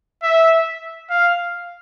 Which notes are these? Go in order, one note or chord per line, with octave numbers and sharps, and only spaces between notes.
E5
F5